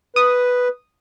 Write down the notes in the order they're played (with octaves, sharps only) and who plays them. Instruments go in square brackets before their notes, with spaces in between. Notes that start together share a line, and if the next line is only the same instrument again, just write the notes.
[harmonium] B4 [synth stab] D#6